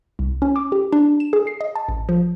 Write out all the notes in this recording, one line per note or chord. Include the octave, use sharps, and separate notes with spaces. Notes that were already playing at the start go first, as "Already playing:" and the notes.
C2
C#4
D6
G4
D4
E7
G#4
C7
D#5
A5
A1
F3